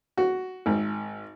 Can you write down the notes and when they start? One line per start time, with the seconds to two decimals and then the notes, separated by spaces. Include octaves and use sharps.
0.17 F#4
0.66 G#1